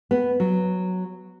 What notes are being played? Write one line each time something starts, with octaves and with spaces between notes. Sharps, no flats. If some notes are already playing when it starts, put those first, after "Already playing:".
B3
F#3